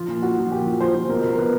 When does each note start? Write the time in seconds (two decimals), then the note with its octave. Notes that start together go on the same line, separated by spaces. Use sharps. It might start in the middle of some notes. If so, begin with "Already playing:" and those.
Already playing: F3 F4
0.08 A#2
0.22 F3 F#4
0.38 F3
0.52 A#2 G4
0.66 F3
0.80 F3 C5
0.94 F3
1.09 B2 A#4
1.24 B2
1.33 A#4
1.37 B2 B4